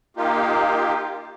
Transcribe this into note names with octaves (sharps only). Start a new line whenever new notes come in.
A#3 D#4 F4 G4